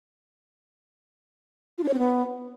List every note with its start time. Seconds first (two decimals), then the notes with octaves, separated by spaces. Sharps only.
1.78 F4
1.83 D4
1.88 C#5
1.93 C4
1.99 B3